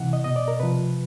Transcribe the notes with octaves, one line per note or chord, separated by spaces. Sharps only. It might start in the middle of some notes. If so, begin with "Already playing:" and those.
Already playing: C3 E3 F#5
D#5
B2 D#5
D5
A#4
C3 F3 B4